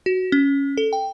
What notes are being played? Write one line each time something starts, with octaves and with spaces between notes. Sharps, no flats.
F#4
C#4
A4
G5